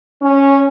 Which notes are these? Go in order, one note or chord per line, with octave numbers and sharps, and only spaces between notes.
C#4